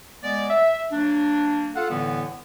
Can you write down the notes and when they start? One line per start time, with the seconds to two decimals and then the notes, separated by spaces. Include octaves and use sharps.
0.23 G#3 B3 D5
0.50 E5
0.92 F#3 A#3 D4
1.75 F4 A4 F5 F#5
1.89 A2 D3 E3 G3 B3